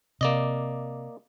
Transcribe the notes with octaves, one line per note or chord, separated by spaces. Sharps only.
C3 A#3 D5 D#5